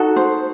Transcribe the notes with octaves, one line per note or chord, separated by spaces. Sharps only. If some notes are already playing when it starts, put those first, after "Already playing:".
Already playing: D#4 F#4 A4
C5